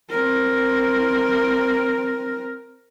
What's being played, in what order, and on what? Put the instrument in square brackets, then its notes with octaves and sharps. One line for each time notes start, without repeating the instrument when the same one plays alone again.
[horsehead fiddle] C4 A#4